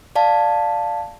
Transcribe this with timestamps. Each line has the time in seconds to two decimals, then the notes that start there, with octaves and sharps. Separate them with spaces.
0.16 D5 F5 A5